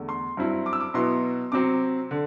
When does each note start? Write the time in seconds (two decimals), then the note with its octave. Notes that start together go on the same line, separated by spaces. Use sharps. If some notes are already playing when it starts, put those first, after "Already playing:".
Already playing: E2 D3 A3
0.09 C6
0.37 G2 F#3 C4 E4
0.66 D6
0.73 E6
0.80 D6
0.94 B2 F#3 B3 E4 C6
1.52 C3 F#3 C4 D6
2.11 D3